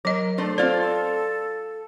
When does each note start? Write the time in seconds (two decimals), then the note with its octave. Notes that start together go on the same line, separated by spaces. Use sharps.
0.05 F#3 A#4 D#5
0.38 A3 D4 A4 C5
0.58 C4 F4 C5 D5